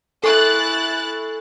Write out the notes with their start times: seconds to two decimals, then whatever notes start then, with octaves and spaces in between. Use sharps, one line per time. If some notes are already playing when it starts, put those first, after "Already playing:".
0.24 E4 A4 G#5 C#6 F#6 A6